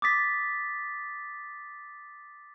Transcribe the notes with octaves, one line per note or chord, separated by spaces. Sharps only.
D6 D#6 A6 B6